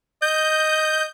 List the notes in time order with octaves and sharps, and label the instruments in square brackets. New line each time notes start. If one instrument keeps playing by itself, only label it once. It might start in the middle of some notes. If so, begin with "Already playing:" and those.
[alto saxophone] D#5 [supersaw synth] G6